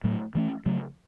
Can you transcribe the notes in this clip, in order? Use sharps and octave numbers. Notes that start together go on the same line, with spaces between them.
A2 F#3 A3
E3 A3 C#4
C#3 F#3 A3